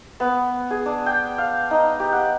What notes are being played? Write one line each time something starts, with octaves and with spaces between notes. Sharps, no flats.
B3
G#4
D4
G5
F5
D#4
G4
F#5